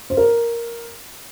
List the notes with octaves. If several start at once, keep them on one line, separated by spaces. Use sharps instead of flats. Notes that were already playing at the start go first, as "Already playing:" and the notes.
C5
A#4